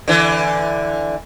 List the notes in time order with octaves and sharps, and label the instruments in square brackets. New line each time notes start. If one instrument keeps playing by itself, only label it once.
[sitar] D3 E3